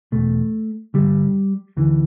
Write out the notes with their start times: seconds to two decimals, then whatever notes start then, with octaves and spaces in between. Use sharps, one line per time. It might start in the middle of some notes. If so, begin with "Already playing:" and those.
0.12 E2 B2 A3
0.94 G2 D3 G3
1.77 D2 D3 E3